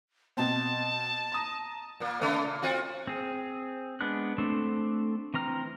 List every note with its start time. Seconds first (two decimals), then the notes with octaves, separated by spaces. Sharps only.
0.37 B2 C4 A5
1.32 A#5 D#6 A#6
2.00 A#2 A#3
2.21 C#3 A3 B3
2.44 A#2
2.62 C4 F4 F#4
3.07 C4 G#4
4.01 G#3 B3 D4 F#6
4.38 A3 C4 D4 A4
5.34 E3 C4 A#5 F6